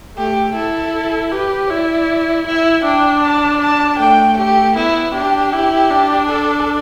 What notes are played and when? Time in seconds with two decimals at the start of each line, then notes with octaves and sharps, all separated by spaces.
0.16 A3 G4
0.55 E4 A4
1.32 G4 B4
1.70 E4 D5
2.46 E4 E5
2.85 D4 G5
3.24 A5
3.61 A5
3.99 A3 G5
4.38 G4
4.76 B3 E4
5.14 D4 G4
5.53 E4
5.90 D4
6.29 A4